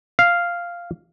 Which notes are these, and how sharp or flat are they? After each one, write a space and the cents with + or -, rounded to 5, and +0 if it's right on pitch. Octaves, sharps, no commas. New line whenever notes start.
F5 -5